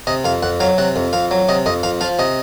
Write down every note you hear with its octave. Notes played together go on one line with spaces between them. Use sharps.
C3 D#5
F2 F5
F2 F#5
F#3 F5
C3 F#5
F2
F2 F5
F#3
C3 D#5
F2 D#5
F2 F5
F3 F5
C3 D#5